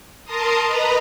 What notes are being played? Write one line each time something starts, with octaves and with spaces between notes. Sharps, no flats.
A#4 A5 A#5 C6 D#6
B4 D#5 A#5 B5